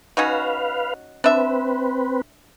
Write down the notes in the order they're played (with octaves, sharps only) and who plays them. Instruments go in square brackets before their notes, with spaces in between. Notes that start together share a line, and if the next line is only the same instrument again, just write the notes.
[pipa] C#4 D#4 F#4 [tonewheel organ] B4 F5
[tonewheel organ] C4 B4 [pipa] D4 E5